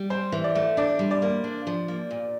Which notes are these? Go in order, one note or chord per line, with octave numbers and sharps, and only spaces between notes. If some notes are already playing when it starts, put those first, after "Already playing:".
Already playing: G3
C4 C5
E3
D5
A3
D4 D5
G3
D5
A#3
D4
F3
A#3
A#2